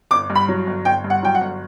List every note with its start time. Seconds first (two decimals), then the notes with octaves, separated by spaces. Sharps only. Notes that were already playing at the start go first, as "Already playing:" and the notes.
0.11 G1 D6
0.30 G2
0.35 B5
0.48 F#3
0.67 G1
0.85 G1 G5
1.04 G2
1.10 F#5
1.22 F#3 G5
1.35 F#5
1.41 G1